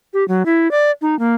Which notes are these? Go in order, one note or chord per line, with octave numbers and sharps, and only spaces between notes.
G4
F#3
E4
D5
D#4
A#3